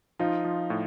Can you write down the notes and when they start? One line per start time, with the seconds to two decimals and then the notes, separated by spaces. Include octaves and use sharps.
0.19 F3 D#4 F4
0.45 F3
0.70 A2